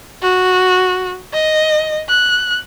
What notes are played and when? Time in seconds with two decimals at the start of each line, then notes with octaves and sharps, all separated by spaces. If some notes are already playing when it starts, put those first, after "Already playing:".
0.22 F#4
1.33 D#5
2.09 F#6